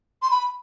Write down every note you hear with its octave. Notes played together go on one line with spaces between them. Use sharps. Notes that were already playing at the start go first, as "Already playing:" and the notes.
C6
B5